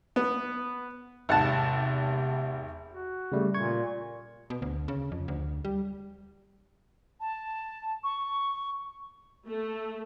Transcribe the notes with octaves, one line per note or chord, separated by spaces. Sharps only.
B3
G#1 E2 C3 F#5 A5
F#4
C#3 G3 A3
A#2 C#6 G#6
B2
D2
C#3
F2
D2
G3
A5
C#6
A3